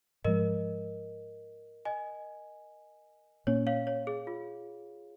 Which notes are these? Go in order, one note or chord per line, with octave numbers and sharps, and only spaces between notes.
G#2 F3 G#3 A#4 D#5
D#5 G#5
A#2 A#3 C#4 C#5
C#5 F5
C#5
G#4
F4